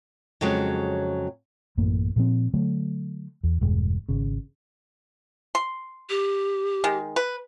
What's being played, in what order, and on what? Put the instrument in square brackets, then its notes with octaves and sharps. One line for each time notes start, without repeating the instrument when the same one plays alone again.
[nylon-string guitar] F2 C#3 F#3 G#3
[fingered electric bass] A1 F#2 A2 A#3
A#2 F3 C4
D3 F#3 A3
E2
E1 G2 G#3
G#1 C#3
[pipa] C6
[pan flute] G4
[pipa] D#3 G#3
B4